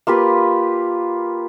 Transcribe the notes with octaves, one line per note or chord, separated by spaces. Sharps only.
A#3 F4 G4 B4